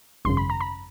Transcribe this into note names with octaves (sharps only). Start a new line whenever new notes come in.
G#1 F#2 C#3 C6
B5
A#5
B5